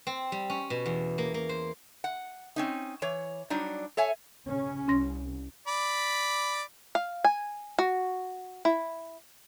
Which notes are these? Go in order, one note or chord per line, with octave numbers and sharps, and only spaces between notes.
C4
G3
C#4
B2
E2
A#3
A#3
C5
F#5
C4 C#4 D#4
E3 C#5
F#3 G3 D4 D#4
A4 C#5 E5 G#5
C#3 C#4
C2 C#4 C6 A#6
D5 B5
F5
G#5
F#4
E4